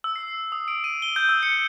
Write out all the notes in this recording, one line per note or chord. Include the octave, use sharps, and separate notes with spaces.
E6
C7
D#6
D7
D#7
G7
G6
E6
C#7